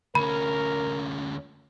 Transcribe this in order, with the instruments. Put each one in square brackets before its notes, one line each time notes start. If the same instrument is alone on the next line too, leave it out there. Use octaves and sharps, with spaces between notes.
[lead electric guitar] D2 C#4 [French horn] A#4 [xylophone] B5